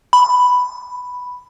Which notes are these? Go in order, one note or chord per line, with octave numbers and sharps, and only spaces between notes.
B5